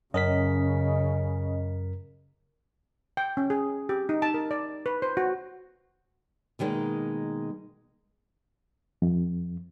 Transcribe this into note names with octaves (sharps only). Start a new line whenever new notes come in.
F#2 C#3 C#4 A#4 D#5 B6
G5
C#4
G#4
G4
D#4
A5
A#4
D5
B4
C5
F#4
B2 D#3 F3 G3 G#3 A#3
F2